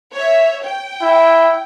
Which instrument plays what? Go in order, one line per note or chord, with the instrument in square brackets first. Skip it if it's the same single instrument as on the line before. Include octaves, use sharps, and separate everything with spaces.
[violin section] C#5 E5
G5
[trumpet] E4